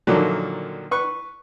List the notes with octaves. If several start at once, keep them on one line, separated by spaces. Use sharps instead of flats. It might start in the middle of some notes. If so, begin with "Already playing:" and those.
A#2 D3 D#3 F3 F#3 A#3
B4 C#6